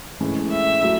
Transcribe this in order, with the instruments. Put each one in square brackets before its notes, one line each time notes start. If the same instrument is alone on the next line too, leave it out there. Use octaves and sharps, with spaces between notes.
[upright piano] A2 E3 G#3 C#4
[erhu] E5
[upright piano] F#3 A3 E4